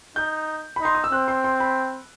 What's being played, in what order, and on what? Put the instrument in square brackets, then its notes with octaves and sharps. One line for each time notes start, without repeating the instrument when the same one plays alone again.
[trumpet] D#4 [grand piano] G6
[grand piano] B5
[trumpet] D#4 [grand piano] C6
[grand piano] D#6
E6
[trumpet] C4 [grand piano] F#6
[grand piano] C6
C6
B5